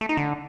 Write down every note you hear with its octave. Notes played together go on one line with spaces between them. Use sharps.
A3
D#4
D3